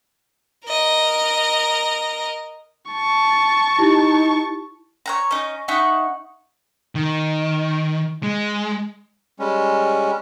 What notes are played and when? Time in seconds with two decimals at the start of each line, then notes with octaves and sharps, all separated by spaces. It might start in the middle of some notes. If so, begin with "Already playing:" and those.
0.67 A#4 D#5
2.92 A5 C#6
3.79 D#4 E4 G4
5.06 C#5 F#5 A#5
5.31 C#4 D#4
5.68 D#4 E5 F#5 C#6
6.95 D#3
8.23 G#3
9.39 G3 G#3 C#4